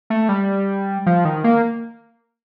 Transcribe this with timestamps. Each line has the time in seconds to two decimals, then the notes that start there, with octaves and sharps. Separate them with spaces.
0.10 A3
0.29 G3
1.06 F3
1.25 D#3
1.44 A#3